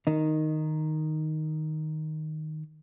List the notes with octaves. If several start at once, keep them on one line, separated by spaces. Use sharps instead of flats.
D#3 D#4